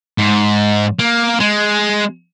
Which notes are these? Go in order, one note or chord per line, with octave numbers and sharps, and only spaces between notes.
G#2
A#3
G#3